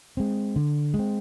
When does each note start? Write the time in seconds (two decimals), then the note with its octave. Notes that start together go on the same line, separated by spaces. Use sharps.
0.17 G#3 C4
0.56 D3
0.94 G#3 C4